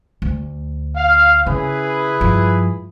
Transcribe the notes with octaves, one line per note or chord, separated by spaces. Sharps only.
D2
F5
C#3 E4 G#4 B4
G2 F3